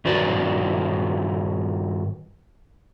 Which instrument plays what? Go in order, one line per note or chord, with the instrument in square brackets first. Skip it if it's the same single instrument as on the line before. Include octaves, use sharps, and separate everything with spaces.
[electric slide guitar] G2 D#3 F#4 B4 D5